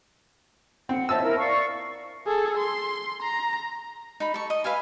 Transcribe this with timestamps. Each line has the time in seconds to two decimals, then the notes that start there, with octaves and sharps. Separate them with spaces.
0.89 C4 F#5
1.09 C5 C#5 D#5 E5 A5 E6
1.22 E4 A#4
1.38 D5 F5 C#6
2.27 G#4 A4
2.58 C6
3.22 A#5
4.20 D#4 B5
4.34 A4 C#6
4.50 D#5
4.64 B4 E5 F5 G#5